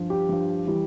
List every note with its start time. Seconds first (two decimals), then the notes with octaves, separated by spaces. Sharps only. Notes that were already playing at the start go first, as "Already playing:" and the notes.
Already playing: G2 F3
0.10 G4
0.29 G2 F3
0.67 E3 G3